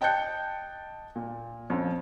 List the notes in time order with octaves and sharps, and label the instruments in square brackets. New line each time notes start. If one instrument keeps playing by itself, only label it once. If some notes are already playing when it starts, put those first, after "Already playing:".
[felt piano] D#5 G5 A5 F#6 G6 C#7
A#2
F2 C#4